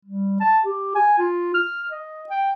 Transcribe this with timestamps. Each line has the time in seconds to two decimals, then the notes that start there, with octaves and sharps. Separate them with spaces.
0.05 G3
0.40 A5
0.65 G4
0.95 G#5
1.19 F4
1.54 F6
1.91 D#5
2.29 G5